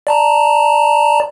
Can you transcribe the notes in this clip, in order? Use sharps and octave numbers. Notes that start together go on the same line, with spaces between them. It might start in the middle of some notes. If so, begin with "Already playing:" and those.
D5 A5 A#5